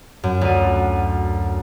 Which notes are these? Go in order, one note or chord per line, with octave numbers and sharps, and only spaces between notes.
F#2
D2 D#7